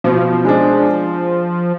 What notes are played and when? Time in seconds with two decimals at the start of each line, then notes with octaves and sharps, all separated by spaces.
0.04 B2 F3
0.45 G#3 D4